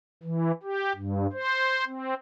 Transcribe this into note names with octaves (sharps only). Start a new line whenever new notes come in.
E3
G4
G2
C5
C4